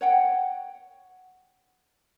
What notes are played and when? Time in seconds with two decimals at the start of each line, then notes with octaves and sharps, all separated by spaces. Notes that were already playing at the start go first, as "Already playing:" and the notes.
0.01 C#5 F#5 G5